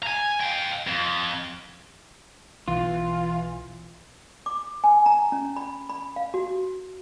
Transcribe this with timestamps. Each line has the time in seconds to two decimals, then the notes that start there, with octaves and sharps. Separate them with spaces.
0.03 G#5 A#5
0.41 F5 G5
0.87 F2
2.68 B1 E3 F4
4.46 D6
4.84 G#5
5.06 A#5
5.32 C#4
5.56 B5
5.89 B5
6.16 F5
6.34 F#4